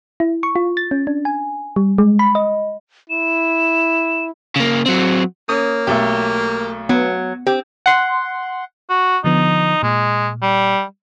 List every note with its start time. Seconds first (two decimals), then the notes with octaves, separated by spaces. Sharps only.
0.20 E4
0.43 C#6
0.56 F4
0.77 A6
0.91 C#4
1.07 D4
1.25 G#5
1.76 G3
1.98 G#3
2.19 B5
2.35 D#5
3.10 E4 E7
4.56 C#3 A#3
4.86 F#3 C4
5.49 A#3 C#4 D#6
5.87 B1 A3 G4 A4
6.89 F#3 B3
7.47 C4 G4
7.86 F#5 C6
8.90 F#4
9.24 D3 F3 B3 D#4
9.83 A#2 G#3
10.42 G3